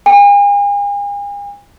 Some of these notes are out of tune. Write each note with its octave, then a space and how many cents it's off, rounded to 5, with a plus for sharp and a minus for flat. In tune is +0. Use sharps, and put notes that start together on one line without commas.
G#5 -40